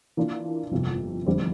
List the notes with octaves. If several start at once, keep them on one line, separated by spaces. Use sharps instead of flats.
E3 A#3 D4 F4
G1 F2 C3
F1 E2 D3 G3 C4